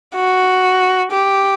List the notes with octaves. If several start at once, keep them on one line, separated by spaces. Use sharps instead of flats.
F#4
G4